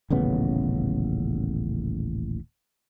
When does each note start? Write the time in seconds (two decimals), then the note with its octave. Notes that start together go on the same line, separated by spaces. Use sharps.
0.10 D#1 A1 C#3 B3